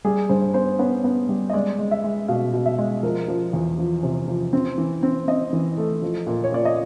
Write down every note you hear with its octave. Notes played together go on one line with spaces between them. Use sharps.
G3 G#4
G2 C5
B3 C5
B3 C#5
B3
G3
D#5
G#3 D5
G#3
E5
G#3
B2 F5
B2
E5
G#3
F3 A#4
F3
E2
F3
C3
F3
C4
E3
C4
C4 D#5
E3
A3
F3
A#2
C#5
A#2 D5
D#5